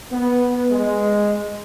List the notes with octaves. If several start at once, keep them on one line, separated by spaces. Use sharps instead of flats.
B3
G#3